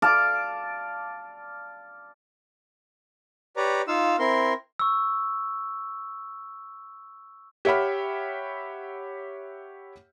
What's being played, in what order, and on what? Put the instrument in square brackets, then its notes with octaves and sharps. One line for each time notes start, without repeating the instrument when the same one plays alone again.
[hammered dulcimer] D5 F5 A5 D6
[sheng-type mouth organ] G4 B4 C#5 D5 A#5
D#4 F4 F5 E6
C4 E4 A#4 C6
[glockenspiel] C#6 E6
[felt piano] G4 C#5 E5 F#5 B5 F6